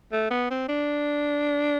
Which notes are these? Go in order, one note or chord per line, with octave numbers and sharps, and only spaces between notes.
A3
B3
C4
D4